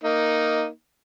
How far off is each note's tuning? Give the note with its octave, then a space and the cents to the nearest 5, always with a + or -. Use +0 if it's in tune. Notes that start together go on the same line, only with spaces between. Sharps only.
A#3 +0 D#4 +0